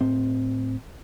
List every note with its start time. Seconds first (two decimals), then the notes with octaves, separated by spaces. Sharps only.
0.01 A2 C4